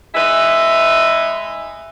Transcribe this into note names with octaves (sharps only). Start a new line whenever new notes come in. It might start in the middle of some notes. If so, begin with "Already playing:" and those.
G#3 D#4 B4 E5